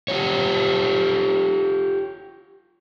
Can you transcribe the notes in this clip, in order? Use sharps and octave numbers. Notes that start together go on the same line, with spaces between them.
F4 G4 C#5